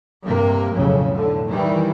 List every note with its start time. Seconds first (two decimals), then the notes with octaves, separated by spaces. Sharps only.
0.22 G2 C3 A#3
0.73 B1 F2 A2 C#3
1.13 A2 D3
1.47 D#3 E3 G3